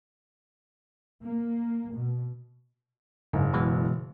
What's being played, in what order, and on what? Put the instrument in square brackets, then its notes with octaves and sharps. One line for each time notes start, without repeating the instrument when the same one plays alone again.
[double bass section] A#3
B2
[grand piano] F#1 [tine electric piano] G#2
[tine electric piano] B2 E3 G#3